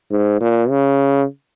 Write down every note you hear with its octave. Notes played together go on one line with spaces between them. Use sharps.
G#2
A#2
C#3